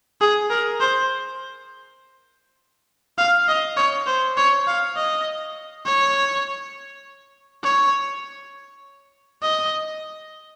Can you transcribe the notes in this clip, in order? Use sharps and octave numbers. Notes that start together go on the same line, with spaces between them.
G#4
A#4
C5
F5
D#5
C#5
C5
C#5
F5
D#5
C#5
C#5
D#5